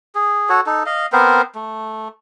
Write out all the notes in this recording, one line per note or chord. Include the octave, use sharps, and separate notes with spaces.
G#4
F#4 A4 C#5
D#4 A4
D#5 F5
B3 C4 A#4 C5
A3